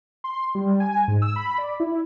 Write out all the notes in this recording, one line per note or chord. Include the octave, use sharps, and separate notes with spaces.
C6
G3
G#5
G#2
E6
B5
D5
E4